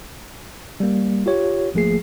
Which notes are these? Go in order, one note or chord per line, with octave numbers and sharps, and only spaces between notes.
G3 A#3
F4 G4 C#5
G#1 F3 A3 A#3 G#4 C7